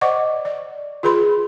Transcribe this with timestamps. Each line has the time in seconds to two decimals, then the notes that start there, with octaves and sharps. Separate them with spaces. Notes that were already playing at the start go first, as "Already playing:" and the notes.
0.01 C5 D5 D#5 F#5 C#6 D6
0.45 D5
1.03 F4 G#4 B4 B5 C6